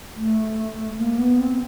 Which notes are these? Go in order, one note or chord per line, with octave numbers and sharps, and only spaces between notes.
A3
A#3
B3
C4